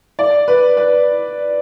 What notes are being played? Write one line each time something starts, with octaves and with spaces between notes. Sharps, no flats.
D5
B4
B4